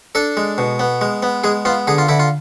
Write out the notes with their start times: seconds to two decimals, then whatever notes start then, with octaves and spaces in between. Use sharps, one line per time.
0.15 D4 A4
0.37 G#3
0.58 B2
0.79 B3
1.01 G#3
1.23 B3
1.44 G#3 G#4
1.65 B3 F4
1.87 D3 G#4
1.98 F4
2.08 D3 E4
2.20 F4